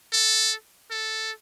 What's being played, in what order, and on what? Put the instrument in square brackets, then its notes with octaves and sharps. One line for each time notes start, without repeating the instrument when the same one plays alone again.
[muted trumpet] A4
A4